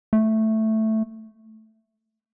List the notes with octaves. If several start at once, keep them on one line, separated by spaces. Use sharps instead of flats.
A3